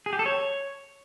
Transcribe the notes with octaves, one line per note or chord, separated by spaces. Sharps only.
G#4
G4
A4
C#5